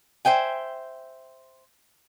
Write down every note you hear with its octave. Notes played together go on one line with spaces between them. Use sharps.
C5 E5 G5 G#5